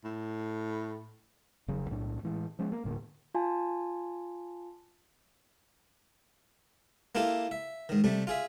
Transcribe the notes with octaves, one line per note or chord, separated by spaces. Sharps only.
A2
F1 C#3 F#3
B1 A2 D4
A2 E3 G#3
F3 G#3 C#4
A#3
D#1 A2 D3 A#3
F4 G#5 A5
A#3 E4 F4 G4 A4
E5
G#2 D#3
C3 G3 A3
F4 G#4 E5